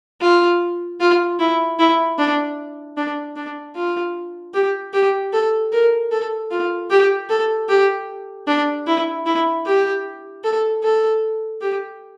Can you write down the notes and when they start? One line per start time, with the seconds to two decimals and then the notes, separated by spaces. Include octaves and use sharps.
0.21 F4
1.00 F4
1.39 E4
1.79 E4
2.18 D4
2.97 D4
3.36 D4
3.75 F4
4.54 G4
4.93 G4
5.33 A4
5.72 A#4
6.11 A4
6.51 F4
6.90 G4
7.29 A4
7.69 G4
8.47 D4
8.87 E4
9.26 E4
9.66 G4
10.44 A4
10.83 A4
11.61 G4